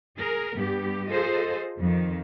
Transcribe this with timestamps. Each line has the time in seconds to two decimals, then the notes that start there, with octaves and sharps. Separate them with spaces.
0.18 G#4 A#4
0.56 G2 B3 G4
1.08 F4 G#4 A4 C5 D#5
1.79 F2 D#3